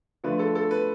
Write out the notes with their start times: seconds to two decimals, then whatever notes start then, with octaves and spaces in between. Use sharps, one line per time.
0.24 D3 F3 A3 B4
0.39 A4
0.55 A4
0.71 B4